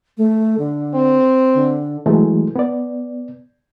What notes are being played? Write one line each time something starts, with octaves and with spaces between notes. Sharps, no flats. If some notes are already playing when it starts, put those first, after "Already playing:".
A3
D3
C4
D3
E3 F#3 G#3 A3
B3 D5